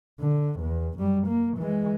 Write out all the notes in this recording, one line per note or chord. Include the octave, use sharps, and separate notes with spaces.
D3
E2
F#2 G3
A#3
E3 G#3